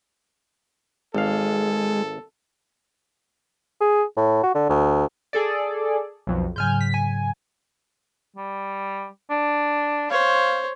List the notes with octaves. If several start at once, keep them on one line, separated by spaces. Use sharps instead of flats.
G#1 G#3 A4 F5
G#4
A2
F#4
D3
D2
G#4 A4 D5
B1 F2
G#2 C#3 F#3 G#5 F6 G6
B6
G#5
G3
D4
C5 C#5 F5